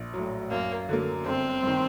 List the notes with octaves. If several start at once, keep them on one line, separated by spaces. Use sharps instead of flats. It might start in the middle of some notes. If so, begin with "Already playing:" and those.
Already playing: A#1
A2 F#3
F#2 A#3
D3 F#3 A#3
G1 C4
G2 D#3